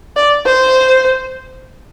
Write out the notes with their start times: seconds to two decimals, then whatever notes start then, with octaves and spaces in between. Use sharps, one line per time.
0.16 D5
0.46 C5